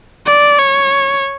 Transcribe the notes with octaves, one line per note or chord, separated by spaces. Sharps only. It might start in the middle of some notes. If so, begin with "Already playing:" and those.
D5
C#5